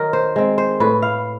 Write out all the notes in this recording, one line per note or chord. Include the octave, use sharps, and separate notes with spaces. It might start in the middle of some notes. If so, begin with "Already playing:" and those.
Already playing: D#3 F#3 A#4
C5
G#3 C4
C5
A2 B4
F5